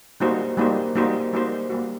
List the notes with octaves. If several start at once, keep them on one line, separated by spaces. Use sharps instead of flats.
G3 A#3 D#4 F#4 C5
G3 A#3 D#4 F#4 C5
G3 A#3 D#4 F#4 C5
G3 A#3 D#4 F#4 C5
G3 A#3 F#4